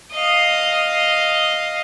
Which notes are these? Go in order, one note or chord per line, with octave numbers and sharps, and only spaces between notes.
D#5 F5